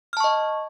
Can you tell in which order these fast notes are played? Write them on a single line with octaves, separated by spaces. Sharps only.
F6 A5 C#6 D#5